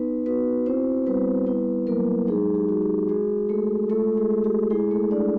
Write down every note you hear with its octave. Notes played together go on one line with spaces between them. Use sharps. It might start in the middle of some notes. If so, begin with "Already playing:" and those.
Already playing: B3 D#4 B4
B3 F#4 B4
C4 E4 C5
G3 B3 B4
B3 E4 B4
F#3 A#3 A#4
G#3 D#4 G#4
G4
F#4
G4
G#3 F#4 G#4
G#3 A3 A4
A3 F4 A4
G#3 G#4
G#3
G4
G#3 E4 G#4
A3 A4
G3 D4 D5